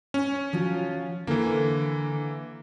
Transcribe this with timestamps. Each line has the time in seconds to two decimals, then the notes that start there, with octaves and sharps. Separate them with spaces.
0.14 C#4
0.53 F3 F#3 F4
1.27 D3 E3 A#3